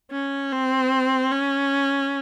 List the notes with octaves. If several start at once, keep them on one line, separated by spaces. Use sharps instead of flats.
C#4
C4
C#4